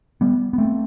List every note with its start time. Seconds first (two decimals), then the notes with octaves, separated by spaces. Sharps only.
0.21 G3 B3
0.53 B3
0.58 A3 C4